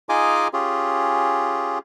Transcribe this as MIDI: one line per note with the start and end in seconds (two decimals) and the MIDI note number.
0.09 0.48 63
0.09 0.48 65
0.09 0.48 68
0.09 0.48 75
0.09 0.48 80
0.09 0.48 86
0.53 1.79 61
0.53 1.79 65
0.53 1.79 67
0.53 1.79 68